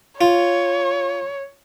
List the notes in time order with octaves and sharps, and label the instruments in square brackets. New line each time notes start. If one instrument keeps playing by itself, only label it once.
[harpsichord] F4 [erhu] C#5